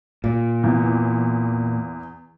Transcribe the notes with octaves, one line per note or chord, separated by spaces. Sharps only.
A#2
E2